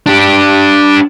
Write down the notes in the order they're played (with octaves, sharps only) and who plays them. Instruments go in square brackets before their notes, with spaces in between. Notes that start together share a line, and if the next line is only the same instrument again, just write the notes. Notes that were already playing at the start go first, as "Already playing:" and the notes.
[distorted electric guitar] D4 G4